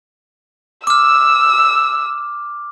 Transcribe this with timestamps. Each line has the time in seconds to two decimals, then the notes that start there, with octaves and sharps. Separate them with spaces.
0.87 D6 E6 F6